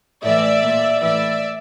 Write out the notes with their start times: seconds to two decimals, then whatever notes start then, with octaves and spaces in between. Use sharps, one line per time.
0.24 A2 E3 D5 E5
0.63 A#2
1.01 A2 E3 D5 E5